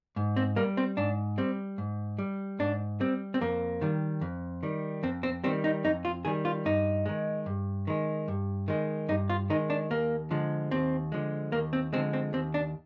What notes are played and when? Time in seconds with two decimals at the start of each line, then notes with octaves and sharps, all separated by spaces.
0.16 G#2
0.37 C4
0.56 G3 A#3
0.77 C4
0.97 G#2 D4
1.38 G3 C4
1.78 G#2
2.19 G3
2.59 G#2 D4
3.00 G3 C4
3.34 C4
3.41 F2 A#3
3.81 D#3 G3
4.21 F2
4.63 D#3 G3
5.03 F2 C4
5.23 C4
5.44 D#3 G3 C4
5.64 D#4
5.84 F2 D#4
6.05 F4
6.25 D#3 G3 G#4
6.45 F4
6.65 G2 D#4
7.06 D#3 G#3
7.46 G2
7.87 D#3 G#3
8.28 G2
8.68 D#3 G#3
9.09 G2 D#4
9.30 F4
9.50 D#3 G#3 D#4
9.70 D4
9.90 D#2 A#3
10.31 D3 F3 G#3
10.71 D#2 C4
11.12 D3 F3 G#3
11.52 D#2 A#3
11.73 C4
11.93 D3 F3 G#3 C4
12.13 C4
12.33 D#2 C4
12.54 D4